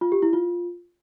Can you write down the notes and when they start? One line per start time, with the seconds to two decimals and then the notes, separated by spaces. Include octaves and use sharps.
0.01 F4
0.12 G4
0.22 E4
0.33 F4